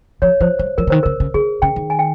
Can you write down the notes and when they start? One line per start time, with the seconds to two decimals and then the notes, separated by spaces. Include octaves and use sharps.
0.22 F3 C#5
0.41 F3 C5
0.59 G3 C5
0.78 F3 A#4
0.87 C#3
0.90 D#3 C5
1.03 C#3 A#4
1.20 C#3
1.34 C#3 G#4
1.62 C#3 G5
1.76 D#3
1.90 G#5
1.99 G5